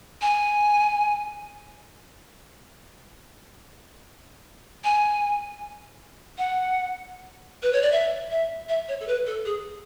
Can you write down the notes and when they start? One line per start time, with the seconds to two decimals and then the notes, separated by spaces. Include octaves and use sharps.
0.22 G#5
4.84 G#5
6.38 F#5
7.63 B4
7.73 C#5
7.82 D5
7.92 E5
8.30 E5
8.69 E5
8.88 C#5
9.01 A4
9.07 B4
9.27 A4
9.46 G#4